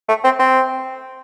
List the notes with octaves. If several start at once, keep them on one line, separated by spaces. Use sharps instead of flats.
A3
C4
C4